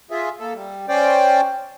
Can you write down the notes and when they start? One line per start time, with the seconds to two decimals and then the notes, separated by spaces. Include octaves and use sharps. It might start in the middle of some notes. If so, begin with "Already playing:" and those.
0.11 F4 G#4 E5
0.40 A#3 A4
0.55 G3
0.88 C#4 C5 D5 G5